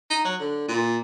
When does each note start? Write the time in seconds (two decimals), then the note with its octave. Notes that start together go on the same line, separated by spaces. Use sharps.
0.10 D#4
0.25 F#3
0.40 D3
0.68 A#2